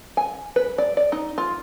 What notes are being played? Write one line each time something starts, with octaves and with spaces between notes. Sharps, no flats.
G#5
B4
D5
D5
D#4
F4